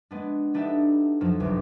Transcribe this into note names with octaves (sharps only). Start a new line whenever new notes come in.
G#3 B3 D4
B3 D4 D#4 G4 A4 E5
F2 F3 F#3 F4
G1 C2 D6